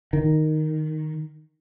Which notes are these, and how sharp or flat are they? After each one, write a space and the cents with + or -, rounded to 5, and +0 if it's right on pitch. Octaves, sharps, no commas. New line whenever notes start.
D#3 -5